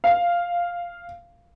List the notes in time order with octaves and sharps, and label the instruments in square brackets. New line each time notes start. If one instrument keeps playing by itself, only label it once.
[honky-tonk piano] F5